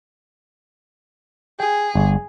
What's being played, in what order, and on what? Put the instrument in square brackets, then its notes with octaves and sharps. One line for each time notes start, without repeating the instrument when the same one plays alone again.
[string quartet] G#4 [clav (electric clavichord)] G5
[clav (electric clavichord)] G1